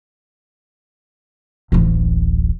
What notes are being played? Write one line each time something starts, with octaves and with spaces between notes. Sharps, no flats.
D1 A1